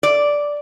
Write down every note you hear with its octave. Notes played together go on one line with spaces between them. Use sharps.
D5